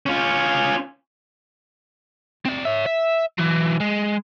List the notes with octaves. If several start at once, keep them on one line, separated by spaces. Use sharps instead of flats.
C#4 F4
C4 D5
C#5 E5
E5
E3 F#3
G#3